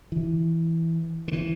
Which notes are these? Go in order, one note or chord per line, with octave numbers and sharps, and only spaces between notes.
E3
D3
E3